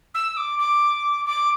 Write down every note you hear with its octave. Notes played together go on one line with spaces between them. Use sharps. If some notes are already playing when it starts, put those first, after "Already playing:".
E6
D6
D6
D6